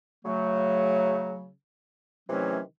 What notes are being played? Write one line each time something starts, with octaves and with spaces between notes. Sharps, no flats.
C#3 F#3 A3
C3 D#3 E3 F#3 A3 C#4